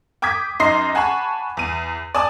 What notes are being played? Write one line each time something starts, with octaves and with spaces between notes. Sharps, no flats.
G5 D6 D#6 G#6 B6
F#2 D#4 D#5 C6 C7
F#5 G#5 A5 B5 C#6
E2 D#7
D5 G#5 A5 D#6